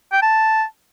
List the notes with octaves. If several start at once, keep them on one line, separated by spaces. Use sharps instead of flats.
G5
A5